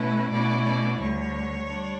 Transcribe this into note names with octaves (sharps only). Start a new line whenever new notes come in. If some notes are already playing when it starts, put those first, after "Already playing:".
Already playing: B2 A3 C#4 E4 B4
B2 A3 C#4 E4 D5
D5
D2 D3 G3 C#5
G3 D4